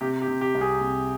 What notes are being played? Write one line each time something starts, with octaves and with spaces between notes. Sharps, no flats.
C3 G4
G4
C3
G4
C2
G#4
C3